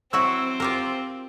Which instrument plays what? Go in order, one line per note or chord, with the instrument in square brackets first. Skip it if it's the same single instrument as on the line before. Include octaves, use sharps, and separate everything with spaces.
[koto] F#3 E4 F#4 [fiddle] C4 [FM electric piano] E6
[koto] F4 G4 A#4